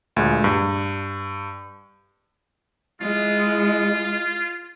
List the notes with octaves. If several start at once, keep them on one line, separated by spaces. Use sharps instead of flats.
D2 A#2 G#3
G2
G#3 E4 F4